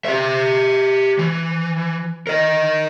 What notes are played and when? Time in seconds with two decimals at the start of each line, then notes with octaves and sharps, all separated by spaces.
0.05 G4 E5
1.19 E3
2.27 A#4 D#5